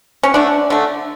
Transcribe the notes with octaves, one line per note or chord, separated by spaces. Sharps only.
C#4
D3 A3 D4
D3 A3